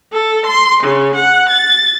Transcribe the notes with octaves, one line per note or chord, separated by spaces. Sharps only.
A4
C6
C#3
F#5
A6